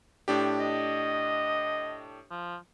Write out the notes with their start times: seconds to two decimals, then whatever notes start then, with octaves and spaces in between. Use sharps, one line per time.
0.28 A2 D4 G4
0.60 D#5
2.31 F3